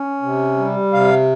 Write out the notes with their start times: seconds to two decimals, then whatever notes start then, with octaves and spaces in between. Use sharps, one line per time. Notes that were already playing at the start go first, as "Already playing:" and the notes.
Already playing: C#4
0.22 C3
0.57 G3
0.93 C3 F5